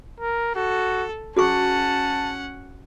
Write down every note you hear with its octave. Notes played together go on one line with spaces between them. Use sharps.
A#4
F#4 A4
C#4 F#4 G#4 F#5 A5 C#6